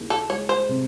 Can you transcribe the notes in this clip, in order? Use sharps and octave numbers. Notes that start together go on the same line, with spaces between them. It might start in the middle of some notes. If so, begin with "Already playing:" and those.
Already playing: D#2 C#3 E3
A4
G#3 C#5
C5
C3